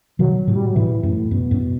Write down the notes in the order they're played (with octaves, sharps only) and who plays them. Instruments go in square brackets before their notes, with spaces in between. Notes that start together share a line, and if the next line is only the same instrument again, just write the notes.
[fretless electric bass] B2 D#3 [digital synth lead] F#3
[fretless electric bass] A2 C3
[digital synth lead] G3
F#3
[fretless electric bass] A2 C3 [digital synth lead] E3
[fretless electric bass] F#2 [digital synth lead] A2
[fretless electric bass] F#2 [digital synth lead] B2
[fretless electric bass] F#2